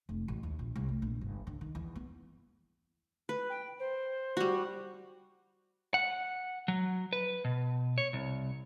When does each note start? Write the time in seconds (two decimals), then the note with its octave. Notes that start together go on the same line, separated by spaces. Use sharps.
0.09 F1
0.28 A1
0.43 D#2
0.59 A#1
0.76 C2
0.89 A3
1.02 A#1
1.21 G1
1.47 D3
1.61 D#3
1.75 E2
1.96 B3
3.29 B4
3.49 G5
3.79 C5
4.37 G3 F#4
5.94 F#5
6.68 F#3
7.13 B4
7.44 B2
7.98 C#5
8.13 C2